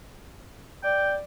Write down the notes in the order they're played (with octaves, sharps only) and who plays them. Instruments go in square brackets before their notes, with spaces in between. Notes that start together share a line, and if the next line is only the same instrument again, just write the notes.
[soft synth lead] D5 [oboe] G5